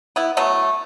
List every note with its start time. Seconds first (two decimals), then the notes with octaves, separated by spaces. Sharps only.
0.16 B3 E4
0.37 F#3 A3 B3